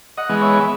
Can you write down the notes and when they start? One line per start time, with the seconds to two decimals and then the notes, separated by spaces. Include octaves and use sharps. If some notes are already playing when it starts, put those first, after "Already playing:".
0.17 D#5 F#5
0.29 E3 G#3 B3
0.42 C#5 E5